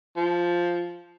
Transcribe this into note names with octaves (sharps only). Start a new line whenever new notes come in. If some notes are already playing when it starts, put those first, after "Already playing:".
F3